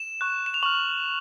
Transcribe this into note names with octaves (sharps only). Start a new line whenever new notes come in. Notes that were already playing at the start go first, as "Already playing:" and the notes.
Already playing: E7
C#6 F#6
E7
F7
C#6 F6 F#7